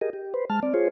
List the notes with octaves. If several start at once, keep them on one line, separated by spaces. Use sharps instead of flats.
G4 G#4 A#4 D#5
G4
B4 C5
G#3 A5 F6
C4 D5
F4 G#4 C5 C#5